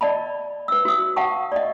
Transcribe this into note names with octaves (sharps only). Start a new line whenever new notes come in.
D5 D#5 A5 B5
B4 E6
F#4 D#6
F5 F#5 A5 C#6
D5 D#5